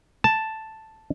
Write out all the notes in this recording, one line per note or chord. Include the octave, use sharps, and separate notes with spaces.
A5